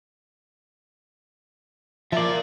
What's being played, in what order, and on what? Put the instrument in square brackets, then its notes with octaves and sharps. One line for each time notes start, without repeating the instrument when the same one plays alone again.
[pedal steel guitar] F3 D5 [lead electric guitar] F4 A#4 [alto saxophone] E5